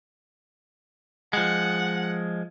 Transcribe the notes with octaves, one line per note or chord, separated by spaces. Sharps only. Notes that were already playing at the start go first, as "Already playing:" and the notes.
F3 G#3 F#5